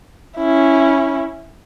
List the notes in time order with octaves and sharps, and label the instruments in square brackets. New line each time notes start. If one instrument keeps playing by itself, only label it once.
[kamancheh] C#4 E4